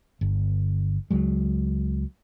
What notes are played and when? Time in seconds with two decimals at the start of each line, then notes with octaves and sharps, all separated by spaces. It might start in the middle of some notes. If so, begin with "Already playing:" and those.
0.21 G1
1.11 C#2 F#3 G#3